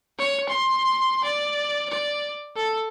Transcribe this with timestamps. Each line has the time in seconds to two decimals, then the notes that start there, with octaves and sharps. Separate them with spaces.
0.19 C#5
0.49 C6
1.24 D5
1.90 D5
2.57 A4